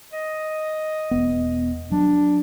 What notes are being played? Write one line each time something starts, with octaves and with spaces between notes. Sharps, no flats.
D#5
E1 B3
F#3 D4